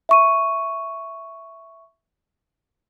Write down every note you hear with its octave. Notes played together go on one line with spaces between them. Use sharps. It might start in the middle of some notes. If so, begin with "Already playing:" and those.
E5 C#6 D#7